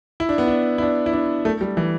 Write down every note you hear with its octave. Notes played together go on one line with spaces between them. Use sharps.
E4
D4
B3
D4
E4
D4
E4
D4
A3
G3
E3